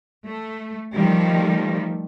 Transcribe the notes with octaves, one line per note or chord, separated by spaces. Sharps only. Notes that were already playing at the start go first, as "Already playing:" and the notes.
A3
D#3 F3 G3 A3